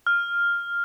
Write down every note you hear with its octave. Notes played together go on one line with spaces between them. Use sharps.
F6